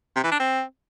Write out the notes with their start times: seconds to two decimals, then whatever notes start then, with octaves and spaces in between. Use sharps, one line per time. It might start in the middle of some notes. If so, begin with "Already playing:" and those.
0.16 C3
0.24 E3
0.32 D4
0.40 C4